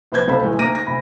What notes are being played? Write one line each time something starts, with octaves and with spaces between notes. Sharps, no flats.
A#1 B4 C5 G6 G#6
C#2 A4 C5 B5
E1 A2 G#3
D2 A#3 D#4 A#6 D7 D#7
A#6
D2 B5